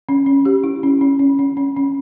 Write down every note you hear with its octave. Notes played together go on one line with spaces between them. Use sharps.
C#4
C#4
G4
E4
C#4
C#4
C#4
C#4
C#4
C#4